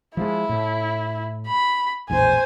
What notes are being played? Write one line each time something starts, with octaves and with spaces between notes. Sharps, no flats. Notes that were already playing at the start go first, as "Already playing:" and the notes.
F3 G3 G#3 E4
A2
B5
A#1 E2 A2 C5 G#5